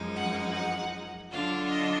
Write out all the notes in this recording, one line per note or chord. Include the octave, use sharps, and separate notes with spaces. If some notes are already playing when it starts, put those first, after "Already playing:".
Already playing: F#2 F3 G#3 D#4
F#5
F#5
D3 F#3 D4 F4 F5
D#5